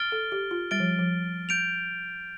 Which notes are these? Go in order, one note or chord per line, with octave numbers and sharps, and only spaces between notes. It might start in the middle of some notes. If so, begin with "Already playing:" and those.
Already playing: F6 A6 D7 G7
A4
G4
F4
G3 F6 A6 D7 G7
F3
F3
G6 D7 F7